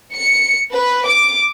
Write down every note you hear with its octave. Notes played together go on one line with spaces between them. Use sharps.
C#7
B4
D6